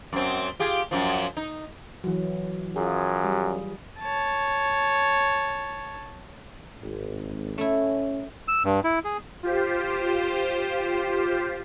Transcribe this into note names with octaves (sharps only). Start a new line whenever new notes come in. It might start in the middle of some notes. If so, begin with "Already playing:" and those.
F#2 C4
F4 G4 G#4
F#2 F3
D#4
E3 F#3
F#2 F4 G#4
G3
C#5 A5
G#1
A3 C#4 E4
E6
G2
E4
G#4
F4 G4 C5